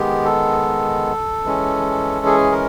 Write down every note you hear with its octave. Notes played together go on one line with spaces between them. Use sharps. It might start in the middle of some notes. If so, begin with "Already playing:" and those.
Already playing: D#3 G#3 B3 G4
A4
E3 G#3 C#4
G#4
A#4